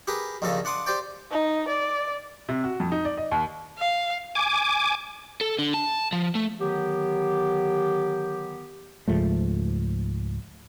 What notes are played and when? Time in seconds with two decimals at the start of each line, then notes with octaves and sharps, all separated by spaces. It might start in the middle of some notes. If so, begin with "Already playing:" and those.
0.07 G4 G#4 A#4 B4
0.42 A#1 D#2 A#2 C#3 A4 D#5
0.65 D4 F#5 C6 D6 D#6
0.86 G4 C5 D5 G5
1.31 D#4
1.68 D5
2.49 C3
2.64 F#4
2.80 F2
2.92 D#4
3.05 D5
3.17 D#5
3.31 D#2
3.79 F5
4.35 G#5 D6
5.41 A4
5.59 D3
5.74 A5
6.13 F3
6.35 A3
6.59 D3 D#3 F#3 B3 G4
9.08 C#2 G#2 F3 A3